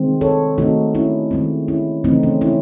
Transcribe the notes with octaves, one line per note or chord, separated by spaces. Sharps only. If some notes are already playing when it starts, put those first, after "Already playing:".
Already playing: D#3 G#3 C4
A4 C#5
D#3 A3 C4 D#4 F#4
C#4 E4
D#3 G#3 C4
C#4 E4
C#3 E3 A3 C4 D#4
C#4
C#4 E4